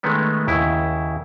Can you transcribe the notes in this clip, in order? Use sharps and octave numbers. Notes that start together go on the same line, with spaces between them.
D#3 G#3 A3 B3 C#4
D#2 C#3 E4